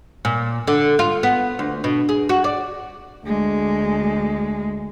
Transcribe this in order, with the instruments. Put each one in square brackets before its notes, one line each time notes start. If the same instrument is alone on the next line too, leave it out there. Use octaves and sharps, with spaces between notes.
[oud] A#2
D3
F4
B3
D2
B2
G#4
F#4
D5
[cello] D2 G#3